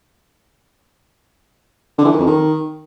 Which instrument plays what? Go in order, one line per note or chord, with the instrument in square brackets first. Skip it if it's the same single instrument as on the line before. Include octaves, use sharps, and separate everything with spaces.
[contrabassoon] D3
E3
D#3
F2
D#3